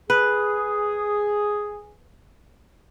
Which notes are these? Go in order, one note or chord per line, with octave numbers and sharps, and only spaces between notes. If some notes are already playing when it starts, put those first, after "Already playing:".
G#4 B4